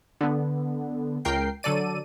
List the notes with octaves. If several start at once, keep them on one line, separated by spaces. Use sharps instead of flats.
D3 B3
C#2 A#4 G5 C7
D3 F#3 A4 D5 D#7